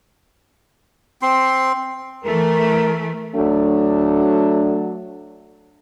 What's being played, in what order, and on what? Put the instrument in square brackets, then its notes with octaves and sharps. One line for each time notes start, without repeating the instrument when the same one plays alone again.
[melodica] C4 C6
[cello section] E3 A3 [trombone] A#4
[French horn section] F#3 A3 D4